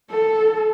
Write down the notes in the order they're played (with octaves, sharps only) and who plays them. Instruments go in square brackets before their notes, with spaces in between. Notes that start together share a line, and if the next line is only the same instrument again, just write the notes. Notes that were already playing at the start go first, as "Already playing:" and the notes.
[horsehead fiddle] A4